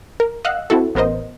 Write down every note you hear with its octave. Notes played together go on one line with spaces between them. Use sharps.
A#4
D#5 F5 F#5 E6 F#6
C4 E4 F#4 A4
A1 B3 A#4 C5 D#5